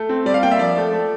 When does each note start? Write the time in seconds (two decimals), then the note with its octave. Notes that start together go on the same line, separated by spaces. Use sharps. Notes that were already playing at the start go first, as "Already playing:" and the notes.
Already playing: A3
0.09 C4
0.26 G3 D5
0.34 F5
0.43 A#3 G5
0.51 E5
0.59 F3 D5
0.77 A3
0.93 A3